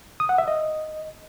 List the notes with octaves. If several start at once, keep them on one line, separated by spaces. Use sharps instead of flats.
D#6
F#5
E5
D#5